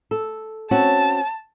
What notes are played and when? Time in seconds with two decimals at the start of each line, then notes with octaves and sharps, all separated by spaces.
0.11 A4
0.71 C4 C#4 F#4 A5